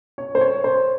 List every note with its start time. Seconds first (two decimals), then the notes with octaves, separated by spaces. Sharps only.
0.18 C#5
0.35 C5
0.41 C#5
0.64 C5